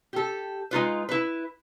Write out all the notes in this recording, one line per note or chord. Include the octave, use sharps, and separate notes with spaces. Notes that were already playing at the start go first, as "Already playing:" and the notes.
G4 A4
G#3 D#4 F4 B4
E4 B4